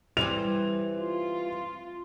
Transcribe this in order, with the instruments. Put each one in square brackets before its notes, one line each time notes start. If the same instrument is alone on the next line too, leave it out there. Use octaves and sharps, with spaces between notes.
[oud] E3 G3 C4 [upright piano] F7
[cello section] F4